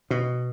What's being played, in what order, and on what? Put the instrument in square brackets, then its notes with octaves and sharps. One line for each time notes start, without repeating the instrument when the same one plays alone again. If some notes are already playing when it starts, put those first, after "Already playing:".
[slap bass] B2